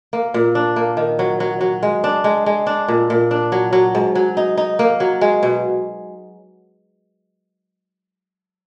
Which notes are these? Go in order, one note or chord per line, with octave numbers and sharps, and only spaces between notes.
A#3
A#2
D4
A#3
D#3
F#3
F#3
F#3
G#3
D4
G#3
G#3
D4
A#2
A#2
D4
F#3
F#3
G#2
F#3
D#4
D#4
A#3
F#3
G#3
B2